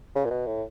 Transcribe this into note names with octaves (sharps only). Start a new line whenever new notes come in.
C#3
A#2
B2
A2